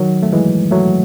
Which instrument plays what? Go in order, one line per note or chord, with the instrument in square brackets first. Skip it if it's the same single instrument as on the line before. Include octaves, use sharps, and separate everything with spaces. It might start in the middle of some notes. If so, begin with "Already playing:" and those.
Already playing: [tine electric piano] D#3 F#3
A3
E3 G#3
F#3 A3